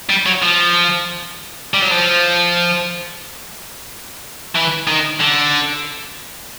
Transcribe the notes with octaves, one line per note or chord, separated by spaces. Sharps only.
G3
F#3
F3
G3
F#3
F3
E3
D#3
D3